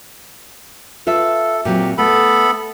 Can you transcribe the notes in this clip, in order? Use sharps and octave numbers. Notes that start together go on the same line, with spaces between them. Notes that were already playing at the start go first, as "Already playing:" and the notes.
F4 A4 B4 E5
A#2 F#3 C4 G4
A3 B3 A4 B5